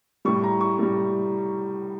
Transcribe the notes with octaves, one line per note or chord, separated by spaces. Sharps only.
A2 G3 C#6
A#5
C#6
A2 G3